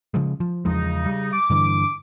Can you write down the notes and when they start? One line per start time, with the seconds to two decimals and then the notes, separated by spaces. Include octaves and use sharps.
0.14 C#3 F3 G#3
0.40 F3
0.65 E2 C#3 F3 G#3 D#4
1.06 G3
1.32 D6
1.50 G2 D3 E3